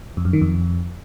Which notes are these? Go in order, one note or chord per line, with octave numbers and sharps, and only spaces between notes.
F2
F#2
D#3
F2